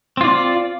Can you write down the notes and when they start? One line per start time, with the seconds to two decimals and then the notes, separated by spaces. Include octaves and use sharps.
0.17 C4
0.21 F4
0.24 D5